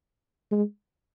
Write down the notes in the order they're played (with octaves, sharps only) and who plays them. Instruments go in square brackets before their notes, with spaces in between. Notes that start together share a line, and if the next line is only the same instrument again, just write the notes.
[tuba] G#3